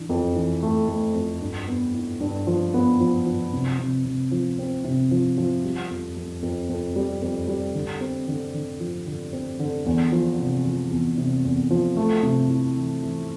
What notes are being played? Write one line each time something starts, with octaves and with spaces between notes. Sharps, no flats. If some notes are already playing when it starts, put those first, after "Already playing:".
Already playing: E3 D4
F2
E3
A3
A3
F2
G2
B3
E4
G2
F3
B3
F3
F3
C3
C3
C3
F3
C4
C3
F3
F3
G3
F2
F2
F2
F2
G3
F2
G3
D3
C4
D3
D3
F3
D3
C4
D3
E2
F3
C3
F3
E2
C3
E2
F3
A3
C3
E4
E3
E3